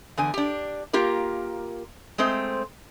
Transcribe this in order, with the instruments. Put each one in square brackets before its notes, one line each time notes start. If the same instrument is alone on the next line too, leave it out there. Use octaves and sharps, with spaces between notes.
[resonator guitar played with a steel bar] E2 D3 G#5
D4 G4
A#3 F4 G4 A#4
G#3 A3 C4 C5